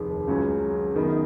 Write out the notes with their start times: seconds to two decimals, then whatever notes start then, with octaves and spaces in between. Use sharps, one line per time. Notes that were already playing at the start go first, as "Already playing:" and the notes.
Already playing: F1 D#2 D#3 G#4
0.27 C#2 C#3 F#3 C#4
0.96 F#2 D#3 F#3 B3 D#4 A#4